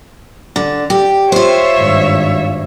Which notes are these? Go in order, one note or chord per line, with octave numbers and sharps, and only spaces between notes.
D3
G4
F4 C5 C#5 E5
G#1 G2